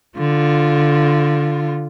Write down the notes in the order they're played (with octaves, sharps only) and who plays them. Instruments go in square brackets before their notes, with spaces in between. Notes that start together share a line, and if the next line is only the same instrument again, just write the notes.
[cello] D3 F4